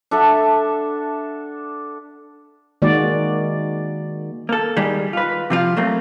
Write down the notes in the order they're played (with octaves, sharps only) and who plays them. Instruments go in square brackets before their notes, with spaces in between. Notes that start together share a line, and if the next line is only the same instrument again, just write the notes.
[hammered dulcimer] D4 A4 E5 F#5
[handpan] D#3 G#3 A#3 F#4 D5
[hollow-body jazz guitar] A#3 A4
D#3 G3 G#3
F4 B4
C3 F3 F4
F#3 A3 A#3 C4